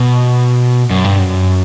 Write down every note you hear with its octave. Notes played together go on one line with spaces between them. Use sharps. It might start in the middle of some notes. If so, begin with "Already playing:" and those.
Already playing: B2
F#2
G2
F#2